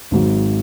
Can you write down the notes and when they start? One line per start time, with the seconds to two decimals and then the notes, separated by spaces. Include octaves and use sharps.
0.11 G#1 G#2 F#3